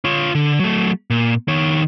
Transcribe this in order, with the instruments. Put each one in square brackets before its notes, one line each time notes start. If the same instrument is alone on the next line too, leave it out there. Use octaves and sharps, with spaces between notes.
[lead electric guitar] F4 C#5
D3
F#3 A3
A#2
D#3 C#5